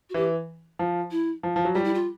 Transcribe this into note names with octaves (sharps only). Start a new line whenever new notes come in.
F#4
E3 G4
F3
E4
F3
F3
F#3
G3 F4
E4
F4